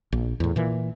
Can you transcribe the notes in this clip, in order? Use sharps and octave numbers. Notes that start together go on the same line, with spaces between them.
A#1
E2 A2
A#2 E3